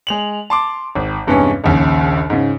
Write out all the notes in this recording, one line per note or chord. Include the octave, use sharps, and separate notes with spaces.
G#3 F7 F#7
A5 C6 D6
G#1
E2 G2 C3 E3 G#3 C#4
A#1 D#2 C#3
G#2 C#3